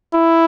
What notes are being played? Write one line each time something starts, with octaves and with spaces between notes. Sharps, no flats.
E4